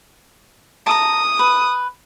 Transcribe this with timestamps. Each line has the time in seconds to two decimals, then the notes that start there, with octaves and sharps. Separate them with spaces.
0.87 A5 A#5 D#6
1.39 B4